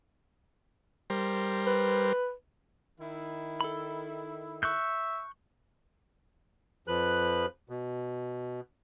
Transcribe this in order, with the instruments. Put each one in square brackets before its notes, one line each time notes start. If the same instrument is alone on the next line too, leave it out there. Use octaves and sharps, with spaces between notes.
[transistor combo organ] G3 A#4 C5
[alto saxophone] B4
[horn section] D#3 E4
[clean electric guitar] A4 B5
[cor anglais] E5 [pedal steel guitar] C#6 F#6 G6
[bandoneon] F2 F3 B4 F#6
B2